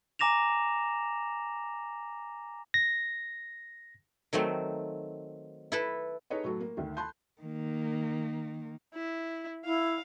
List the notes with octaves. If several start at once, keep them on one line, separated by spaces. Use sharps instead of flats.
G#5 A#5 D6 A#6 E7 F7
A#6
D#3 F#3 A3 C4
E4 A4 B4
D#4 G#4 A4 B4 C#5 D#5
A2 F#3 F#4 A4
A#3
D2 D#3
A5 B5 C6 F#6 G6
D#3 A#3
E4
E4 F5